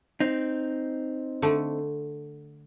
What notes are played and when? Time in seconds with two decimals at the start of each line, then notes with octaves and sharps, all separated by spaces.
0.20 C4 D#4
1.42 D3 A3